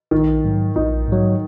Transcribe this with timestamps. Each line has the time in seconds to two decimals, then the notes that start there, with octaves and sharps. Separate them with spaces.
0.11 A#1 D#3
0.45 G#2 F#3
0.76 A#1 D#4
1.09 G#2 F#3